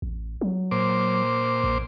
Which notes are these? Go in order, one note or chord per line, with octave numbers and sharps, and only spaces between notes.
A1
F#3
A#2 C5 D6
A#1